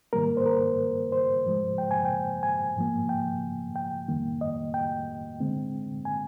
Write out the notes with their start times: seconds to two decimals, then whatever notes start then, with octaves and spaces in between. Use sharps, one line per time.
0.13 G#2 D#3 G3 A#3 A#4
0.37 C5
0.46 A#4
1.12 C5
1.45 G#2 F3 G#3
1.78 G5
1.91 G#5
2.05 G5
2.43 G#5
2.76 G#2 F3 A#3
3.09 G5
3.76 G5
4.08 F2 D#3 G3 A#3
4.41 D#5
4.74 G5
5.40 D3 G#3 C4
6.05 G#5